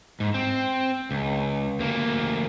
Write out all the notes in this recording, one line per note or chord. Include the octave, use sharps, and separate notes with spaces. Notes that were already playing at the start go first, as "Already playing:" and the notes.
G#2
C4
C#2
D2 A#3